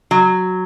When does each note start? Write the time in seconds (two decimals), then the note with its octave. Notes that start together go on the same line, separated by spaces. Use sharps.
0.11 F#3